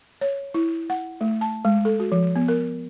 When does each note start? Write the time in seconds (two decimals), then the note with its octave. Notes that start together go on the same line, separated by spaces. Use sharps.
0.21 C#5
0.54 E4
0.90 F#5
1.21 A3
1.41 A5
1.65 G#3
1.85 A4
2.00 F#4
2.12 F3
2.36 B3
2.48 A#4